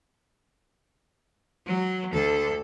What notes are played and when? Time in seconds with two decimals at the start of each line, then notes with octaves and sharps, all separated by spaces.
1.67 F#3
2.12 D2 A4